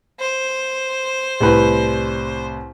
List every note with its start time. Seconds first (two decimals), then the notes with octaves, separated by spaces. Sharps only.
0.20 C5
1.40 C2 A2 B4